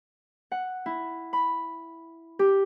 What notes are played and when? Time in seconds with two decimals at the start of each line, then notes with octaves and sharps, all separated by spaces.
0.52 F#5
0.86 E4
1.33 B5
2.39 G4